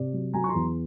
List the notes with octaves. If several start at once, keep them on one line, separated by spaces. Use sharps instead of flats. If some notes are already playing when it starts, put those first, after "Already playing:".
Already playing: C3 D5
F#3
F#3 G#5 A#5
C#6
A#5 C6
E2